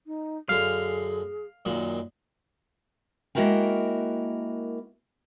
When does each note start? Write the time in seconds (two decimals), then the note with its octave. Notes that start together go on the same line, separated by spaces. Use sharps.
0.07 D#4
0.49 F#2 D3 G#4 F5
1.65 F#2 A#2 D#3
3.35 G#3 A#3 E4 F#4 A#4 G5